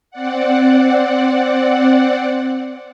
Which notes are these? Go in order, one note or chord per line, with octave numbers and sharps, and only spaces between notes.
C4 D5 F#5